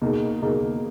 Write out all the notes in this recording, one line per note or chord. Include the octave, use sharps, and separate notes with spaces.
B2 A#3 D#4 G#4
B2 A#3 D#4 G#4